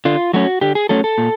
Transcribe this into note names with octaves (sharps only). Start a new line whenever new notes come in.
D3 F4
F#3 A3 C#4 F#4
D3 G4
G#4
F#3 A3 C#4 A4
A4
A#2